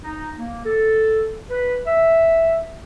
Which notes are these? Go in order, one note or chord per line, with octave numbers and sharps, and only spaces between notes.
D#4
A#3
A4
B4
E5